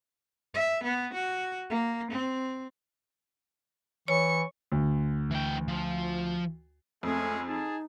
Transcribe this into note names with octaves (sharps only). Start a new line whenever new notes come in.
E5
B3
F#4
A#3
C4
E3 C#5 C#6 C#7
D2
E3 G5
F3
F2 G#3 A3 C#4 G#4
D#4 G#4 A5